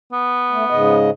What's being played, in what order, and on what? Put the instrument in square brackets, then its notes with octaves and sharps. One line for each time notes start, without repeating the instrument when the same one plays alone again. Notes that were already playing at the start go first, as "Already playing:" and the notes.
[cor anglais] B3
[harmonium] A3
G#2 C#3 D#5